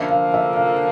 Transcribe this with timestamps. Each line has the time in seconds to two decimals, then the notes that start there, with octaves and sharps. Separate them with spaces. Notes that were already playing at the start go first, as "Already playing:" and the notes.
Already playing: D3 F3 A#3 E5
0.11 F5
0.34 E5
0.56 F5